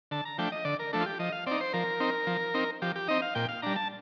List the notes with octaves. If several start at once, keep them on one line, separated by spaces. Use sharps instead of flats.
D3 A5
A#5
F3 A3 D4 G5
D#5
D3 D5
A#4
F3 A3 D4 A4
F4
G4
F3 D#5
F5
C4 D#4 D5
C5
F3 A#4
C4 D#4
F3
C4 D#4
F3 G4
G4
C4 D#4 D#5
F5
A#2 G5
F5
G3 D4 A#5
A5